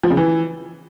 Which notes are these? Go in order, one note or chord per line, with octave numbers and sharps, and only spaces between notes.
F3
C#3
E3